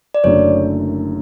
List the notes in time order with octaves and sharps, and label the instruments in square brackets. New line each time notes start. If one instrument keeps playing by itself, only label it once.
[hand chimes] D5
[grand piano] F#1 F#2 D3 A3 [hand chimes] C#5